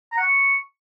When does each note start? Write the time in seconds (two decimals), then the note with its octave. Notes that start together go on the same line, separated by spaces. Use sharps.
0.12 A#5
0.17 F#5
0.23 C#6